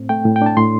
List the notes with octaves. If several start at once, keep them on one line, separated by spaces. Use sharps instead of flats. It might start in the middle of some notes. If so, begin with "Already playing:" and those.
Already playing: A2 C4
A3 G5
A2
G5
D4 A5
A2 C6